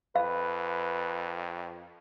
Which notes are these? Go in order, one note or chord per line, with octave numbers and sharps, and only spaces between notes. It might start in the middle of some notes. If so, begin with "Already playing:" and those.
F2 B4 F5